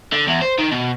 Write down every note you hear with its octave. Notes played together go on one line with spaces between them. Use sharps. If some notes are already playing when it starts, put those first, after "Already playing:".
D3
E2
C5
D#3
B2